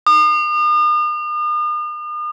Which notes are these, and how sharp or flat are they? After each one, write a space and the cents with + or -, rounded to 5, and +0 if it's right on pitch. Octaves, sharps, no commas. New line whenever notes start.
D#6 -45